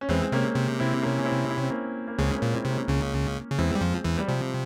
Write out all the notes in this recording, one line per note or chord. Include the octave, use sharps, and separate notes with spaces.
C#4
E2 E3 G#3 C4
C3 A#3 C#4
C3
C4 E4
A#3 C#4
C#4
C4 E4
E4
C#4
C4
A#3 C#4
A#3
C#2 C#3 G#3 C4
A#3 C#4
A#2
C4 E4
C3
A#3 C#4
C#2 C#3
C#3
E2 E3 G#3 C4
G3
F2 F3
E2 E3
G3
C3 F3